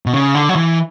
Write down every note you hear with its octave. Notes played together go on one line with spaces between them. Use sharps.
B2
C#3
D3
F#3
E3